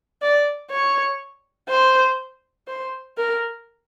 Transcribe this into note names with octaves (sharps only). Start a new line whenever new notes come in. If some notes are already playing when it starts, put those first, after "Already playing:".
D5
C#5
C5
C5
A#4